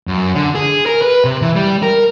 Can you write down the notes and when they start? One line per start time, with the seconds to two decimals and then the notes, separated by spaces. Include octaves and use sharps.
0.07 F#2
0.35 D3
0.55 G#4
0.86 A#4
1.02 B4
1.25 C3
1.42 E3
1.56 G3
1.83 A#4